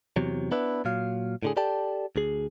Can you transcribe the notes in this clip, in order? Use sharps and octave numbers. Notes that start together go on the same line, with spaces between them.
E2 C3 F#3
B3 D4 E4 B4
A#2 F#3 F5
A2 D3 G#4
G4 A4 D5 G5 A5
D2 G#4